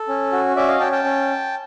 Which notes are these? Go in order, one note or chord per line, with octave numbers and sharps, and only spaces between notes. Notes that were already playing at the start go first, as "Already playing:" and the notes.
Already playing: A4
C#4
F#4
C#4 D5 E5
D#5 F5
C#4 G5 A5
G5 A5
C#4